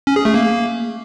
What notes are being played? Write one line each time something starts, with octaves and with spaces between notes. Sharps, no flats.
C#4
G#4
A3
A#3